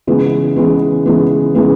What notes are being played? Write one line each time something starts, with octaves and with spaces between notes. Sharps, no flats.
C#3 E3 G#3 B3
C#3 E3 G#3 B3
C#3 E3 G#3 B3
C#3 E3 G#3 B3